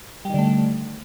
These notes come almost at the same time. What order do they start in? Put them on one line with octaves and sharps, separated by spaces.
G3 D#3 D3 A3